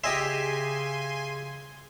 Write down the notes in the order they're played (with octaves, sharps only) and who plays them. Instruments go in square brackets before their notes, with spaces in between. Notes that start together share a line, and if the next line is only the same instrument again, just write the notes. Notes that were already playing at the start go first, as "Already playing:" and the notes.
[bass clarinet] C#3 [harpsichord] G4 D#5 E5 [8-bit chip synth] G#5 C6